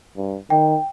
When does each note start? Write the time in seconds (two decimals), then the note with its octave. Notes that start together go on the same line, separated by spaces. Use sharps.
0.16 G2
0.50 D#3 G5